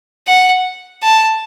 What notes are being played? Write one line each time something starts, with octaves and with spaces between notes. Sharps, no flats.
F#5
A5